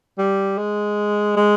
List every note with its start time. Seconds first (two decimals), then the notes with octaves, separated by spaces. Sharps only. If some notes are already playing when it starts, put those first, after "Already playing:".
0.18 G3
0.58 G#3
1.37 G#3